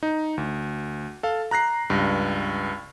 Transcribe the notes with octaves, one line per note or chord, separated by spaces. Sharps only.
D#4
D2
A4 F5
A#5 F#6 A#6 C7
C#2 G2